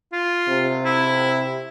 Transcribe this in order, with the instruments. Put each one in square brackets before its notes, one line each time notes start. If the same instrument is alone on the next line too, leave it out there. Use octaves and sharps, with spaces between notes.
[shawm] F4
[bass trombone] C3
[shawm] E4